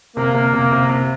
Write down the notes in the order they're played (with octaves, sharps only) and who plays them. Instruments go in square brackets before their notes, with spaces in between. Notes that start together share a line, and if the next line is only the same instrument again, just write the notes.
[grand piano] C3 [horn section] A#3
[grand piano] C3
C3
C3
C3